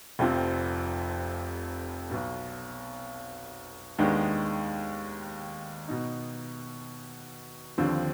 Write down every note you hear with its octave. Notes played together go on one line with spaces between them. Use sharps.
F1 F2 C3 F3 C4
B1 B2 B3
D#2 D#3 G#3 B3 D4
B2 B3 D#4
D#2 D3 F3 C4